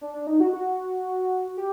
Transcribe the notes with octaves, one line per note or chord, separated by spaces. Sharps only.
D4
D4
D#4
F#4
F#4
G4